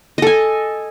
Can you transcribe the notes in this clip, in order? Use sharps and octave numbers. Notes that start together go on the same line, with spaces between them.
A4 D#5 G#5